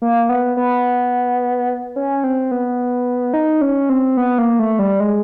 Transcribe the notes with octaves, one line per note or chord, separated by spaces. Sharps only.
A#3
B3
B3
C#4
C4
B3
D#4
C#4
C4
B3
A#3
A3
G3
G#3